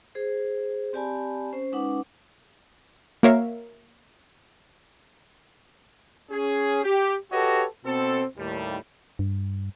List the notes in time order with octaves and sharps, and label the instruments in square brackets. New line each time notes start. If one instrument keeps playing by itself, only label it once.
[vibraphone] G#4 C5
C4 G4 D5 G#5 A5 B5
C#4 C5
G#3 C#4 D#4 B4 F#5 D6
[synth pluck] A#3 F#4 A#4 C#5 E5 F5
[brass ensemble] C#4 G#4
G4
F#4 G4 A4 B4 C#5 D#5
B2 C4 A4
D#2 A2 G3
[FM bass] G2